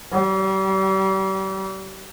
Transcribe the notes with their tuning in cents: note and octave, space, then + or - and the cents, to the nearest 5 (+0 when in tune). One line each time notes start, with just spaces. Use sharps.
G3 -35